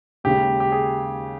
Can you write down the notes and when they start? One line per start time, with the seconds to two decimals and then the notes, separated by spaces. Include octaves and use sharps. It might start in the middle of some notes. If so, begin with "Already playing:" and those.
0.24 D#2 C#3 G#3 G4
0.60 G4
0.72 G#4